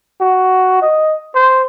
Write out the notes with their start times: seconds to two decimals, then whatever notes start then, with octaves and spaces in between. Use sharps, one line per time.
0.21 F#4
0.82 D#5
1.35 C5